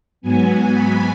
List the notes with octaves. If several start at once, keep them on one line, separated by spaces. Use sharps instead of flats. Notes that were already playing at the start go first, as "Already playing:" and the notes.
G#2 F#3 B3 G#5
B5